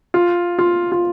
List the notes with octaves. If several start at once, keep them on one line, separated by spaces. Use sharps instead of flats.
F4
F4
F4